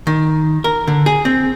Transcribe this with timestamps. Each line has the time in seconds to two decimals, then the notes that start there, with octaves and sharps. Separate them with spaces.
0.07 D#3
0.64 A#4
0.87 D3
1.06 G#4
1.25 C4